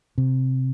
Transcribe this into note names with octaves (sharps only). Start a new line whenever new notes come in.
C3